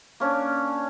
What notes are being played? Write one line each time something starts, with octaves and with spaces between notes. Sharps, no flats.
A#3 C#4 D4